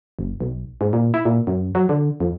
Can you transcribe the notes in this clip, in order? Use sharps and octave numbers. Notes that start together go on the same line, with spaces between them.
F#1
B1
G#2
A#2
E4
A#2
F#2
F#3
D3
F2